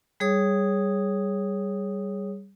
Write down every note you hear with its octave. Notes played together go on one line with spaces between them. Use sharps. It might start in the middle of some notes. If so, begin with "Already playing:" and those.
G3 G#4 C#5 D#6